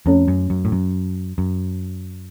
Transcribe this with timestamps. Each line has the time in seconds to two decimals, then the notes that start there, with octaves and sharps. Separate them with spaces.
0.06 F2 A3 C#4 A4 C#5
0.28 F#2
0.50 F#2
0.65 A2
0.72 F#2
1.38 F#2